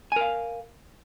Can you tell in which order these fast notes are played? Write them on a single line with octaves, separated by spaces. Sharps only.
G#5 A#4 F5